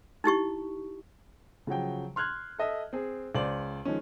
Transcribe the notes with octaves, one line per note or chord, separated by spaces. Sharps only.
D#4 E4 G4 C#6
C#3 F3 F#3 G5
C6 F6 F#6 G#6
A4 D#5 E5
C4 G#4
C#2 C5 D5 F#7
D#3 F3 G#3 C#4